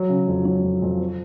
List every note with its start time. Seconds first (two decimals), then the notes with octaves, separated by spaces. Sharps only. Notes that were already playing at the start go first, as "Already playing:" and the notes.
Already playing: F#3
0.09 C#3
0.28 F2
0.45 F#3
0.63 F2
0.82 F2
1.00 C4